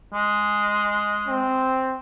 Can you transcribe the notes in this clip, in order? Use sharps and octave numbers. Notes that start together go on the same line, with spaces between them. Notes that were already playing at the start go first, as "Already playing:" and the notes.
G#3
C4